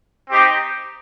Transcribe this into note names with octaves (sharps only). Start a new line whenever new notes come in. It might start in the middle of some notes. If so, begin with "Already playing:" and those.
C4 D#4 G4